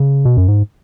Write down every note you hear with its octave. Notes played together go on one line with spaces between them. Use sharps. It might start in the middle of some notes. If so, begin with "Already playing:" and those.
Already playing: C#3
B2
F#2
G#2